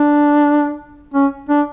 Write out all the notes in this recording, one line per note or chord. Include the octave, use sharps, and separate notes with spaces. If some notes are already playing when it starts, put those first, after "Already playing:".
Already playing: D4
C#4
D4